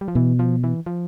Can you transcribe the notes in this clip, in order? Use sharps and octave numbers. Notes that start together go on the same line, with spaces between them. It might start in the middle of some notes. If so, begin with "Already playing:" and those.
G3
F3
B2 E3
F3
E3
F3